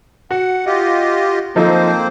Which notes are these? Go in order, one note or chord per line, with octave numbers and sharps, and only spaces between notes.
F#4 F#5
F4 G4 D#5
F3 A#3 C4 D#4 A4 C5